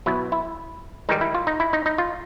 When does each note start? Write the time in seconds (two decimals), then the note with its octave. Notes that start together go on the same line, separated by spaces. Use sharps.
0.06 B2 F#3 B3 E4
0.32 E4
1.09 G#2 D#3 G3 D#4
1.21 E4
1.35 F4
1.47 D#4
1.60 E4
1.73 D#4
1.86 D#4
1.98 F4